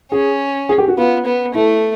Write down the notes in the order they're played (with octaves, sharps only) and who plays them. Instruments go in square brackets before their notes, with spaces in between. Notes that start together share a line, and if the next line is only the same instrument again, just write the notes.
[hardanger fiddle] C#4 [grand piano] G#4
[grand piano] G#4
G4
F#4
[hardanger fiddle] B3 [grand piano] F4
[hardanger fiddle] B3
[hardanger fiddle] A3 [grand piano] E4